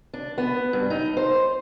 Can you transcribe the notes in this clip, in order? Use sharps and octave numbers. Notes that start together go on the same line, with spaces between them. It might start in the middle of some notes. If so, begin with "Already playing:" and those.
D4
B3
G2
D#4
C5